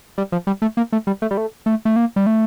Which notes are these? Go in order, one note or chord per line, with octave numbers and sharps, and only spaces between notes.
G3
F3
G3
A3
A#3
A3
G3
A3
G3
A3
A3
A3
A#3
G3
A3